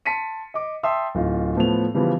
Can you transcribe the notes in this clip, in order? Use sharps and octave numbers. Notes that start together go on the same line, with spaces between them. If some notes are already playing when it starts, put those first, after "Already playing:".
A5 C6 B6 C#7 D#7
D#5 D6
E5 G5 A5 C6 D#6 E6
D1 D#4 F4
A2 F3 A3 B3 B4 F7
C#3 E3 F3 G3 B3